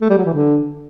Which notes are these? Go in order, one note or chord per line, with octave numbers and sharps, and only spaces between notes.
A3
G3
F#3
E3
D3